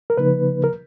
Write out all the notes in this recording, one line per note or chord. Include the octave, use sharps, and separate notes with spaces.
A#4
C#3 F3 A#3 D#4 B4
A#4